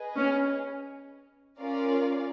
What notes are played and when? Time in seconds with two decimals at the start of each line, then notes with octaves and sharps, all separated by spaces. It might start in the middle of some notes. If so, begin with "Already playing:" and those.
Already playing: G#4 B4 D#5
0.17 C#4
1.60 C#4 F4 A#4 D5 F5